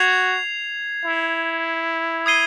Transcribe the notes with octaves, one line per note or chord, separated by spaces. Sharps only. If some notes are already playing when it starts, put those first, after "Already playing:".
Already playing: F#4 G#6 C7 F7
E4
D#6 G#6 C7 D#7 G7